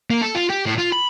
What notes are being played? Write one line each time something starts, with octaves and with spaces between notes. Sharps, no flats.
A#3
A4
F4
G4
A2
F4
B5